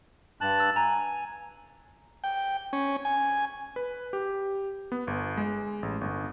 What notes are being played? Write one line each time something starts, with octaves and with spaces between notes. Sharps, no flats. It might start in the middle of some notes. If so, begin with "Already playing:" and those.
G2 A5 F#6
E6
G#5 A#5
G5
C#4
G#5
B4
G4
B3
G1
G#3
A1
G1